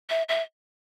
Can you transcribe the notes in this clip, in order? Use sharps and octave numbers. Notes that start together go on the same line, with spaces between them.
E5
E5